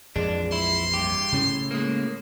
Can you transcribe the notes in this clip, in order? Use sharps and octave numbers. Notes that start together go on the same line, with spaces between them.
A#1 F2 E3 G#3 D4
E4 C6
G2 G4
A2 C#3 A3 C#4 E4
G#3 A#3